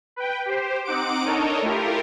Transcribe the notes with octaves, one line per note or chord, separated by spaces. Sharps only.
B4 G5
G4 C5
C4 D#4 F#5 D6 D7
D4 D#4 A4 A#4 C#5 D#5
A3 E4 F4 G4 A#4